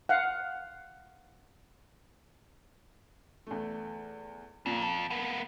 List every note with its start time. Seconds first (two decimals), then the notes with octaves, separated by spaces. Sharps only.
0.09 F5 F#5
3.47 E2 A3
4.66 F2 A#2 A#3
4.82 A5
5.10 A#3 B3